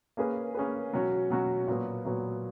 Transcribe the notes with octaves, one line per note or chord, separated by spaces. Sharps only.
A#3 C#4 G#4 B4
A#3 C#4 G#4 B4
B2 F#3 C#4 F#4
B2 F#3 C#4 F#4
A#2 F#3 B3
A#2 F#3 B3